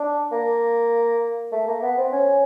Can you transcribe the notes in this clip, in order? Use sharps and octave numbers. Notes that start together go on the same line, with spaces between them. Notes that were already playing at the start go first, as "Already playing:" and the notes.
Already playing: D4
A#3
A3
A#3
B3
C4
C#4